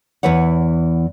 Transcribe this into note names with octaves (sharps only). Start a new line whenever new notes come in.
E2 E3 B4 C#5 F#5